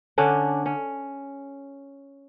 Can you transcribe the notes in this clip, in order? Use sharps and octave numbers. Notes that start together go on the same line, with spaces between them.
D3 C#4 D4
C#4